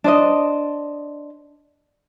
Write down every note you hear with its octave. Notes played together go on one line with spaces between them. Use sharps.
D4 C5 D#5